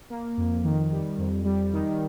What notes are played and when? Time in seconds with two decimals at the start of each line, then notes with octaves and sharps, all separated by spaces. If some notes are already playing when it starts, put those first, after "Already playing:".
0.10 A#3
0.37 F2
0.64 D#3
0.92 G3
1.18 F2
1.45 G3
1.73 D#3